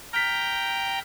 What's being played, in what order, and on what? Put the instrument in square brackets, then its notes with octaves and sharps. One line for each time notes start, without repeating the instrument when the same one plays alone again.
[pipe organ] G5 A#5 [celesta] F6 B6